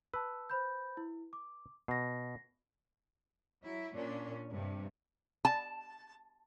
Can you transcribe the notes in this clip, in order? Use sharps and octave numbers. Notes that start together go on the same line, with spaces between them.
B4 A5 E6
C5 B5 G6
E4
D6
B2 A#6 C7
F#3 E4
A#2 C#4 D4
G2 C3
A5